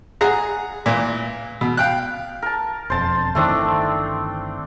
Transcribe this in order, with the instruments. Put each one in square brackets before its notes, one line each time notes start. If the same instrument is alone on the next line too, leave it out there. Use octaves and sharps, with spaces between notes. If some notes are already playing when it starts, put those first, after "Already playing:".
[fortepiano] G#4 F#5 A#5
A#2 E3
B2
F5 G5 F#6
[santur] A#4 A5
[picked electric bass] E1 F2 [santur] C5 A5
[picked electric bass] G1 D#3 E3 [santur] A3 C4 D4